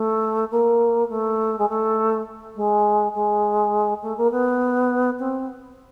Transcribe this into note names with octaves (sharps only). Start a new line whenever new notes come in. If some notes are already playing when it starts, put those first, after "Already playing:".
Already playing: A3
A#3
A3
G#3
A3
G#3
G#3
A3
A#3
B3
C4